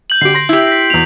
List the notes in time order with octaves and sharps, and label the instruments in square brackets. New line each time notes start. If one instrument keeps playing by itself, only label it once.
[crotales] G6 F#7
[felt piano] D3 G4 [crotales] C7 D7
[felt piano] C6 A#6
[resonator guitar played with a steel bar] E4 G4
[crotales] B6
[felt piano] E2 B2 [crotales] F7